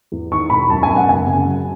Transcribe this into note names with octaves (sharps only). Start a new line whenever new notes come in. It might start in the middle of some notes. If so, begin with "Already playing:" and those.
E2
D#3 C#6
E1 B5
F#2 A5
G#5
F#2
F#5
F#1 G#5
C#3
F#3